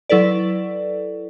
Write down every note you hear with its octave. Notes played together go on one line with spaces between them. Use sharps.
F#3 E4 A4 B4 D5